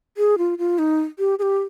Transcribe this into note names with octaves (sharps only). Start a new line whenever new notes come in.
G#4
F4
F4
D#4
G4
G#4
G4